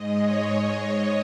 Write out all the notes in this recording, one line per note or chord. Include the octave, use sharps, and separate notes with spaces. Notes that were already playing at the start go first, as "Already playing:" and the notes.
Already playing: G#2 G#3 D#5
C#5
D#5